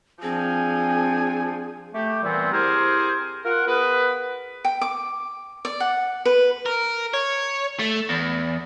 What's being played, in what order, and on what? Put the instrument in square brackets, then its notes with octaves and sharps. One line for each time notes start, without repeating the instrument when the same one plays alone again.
[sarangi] F3 [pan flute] C4 [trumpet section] D4 G#5 [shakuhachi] G#4
[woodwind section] A3 G4
A#2 E3 G3 B3 C4
C4 E4 G4 G#4 A#4 C5
F4 A#4 F#5
B3 G#4 A#4 B4
[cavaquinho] G5
D6
D5
F#5
B4
[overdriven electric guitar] A#4
C#5
A3
E2